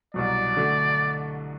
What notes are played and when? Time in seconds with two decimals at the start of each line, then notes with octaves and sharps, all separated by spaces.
0.14 C2 B2 F#3 D5
0.56 D3 A3 D4 F#4